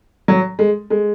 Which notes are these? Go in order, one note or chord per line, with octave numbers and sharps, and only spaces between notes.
F#3
G#3
G#3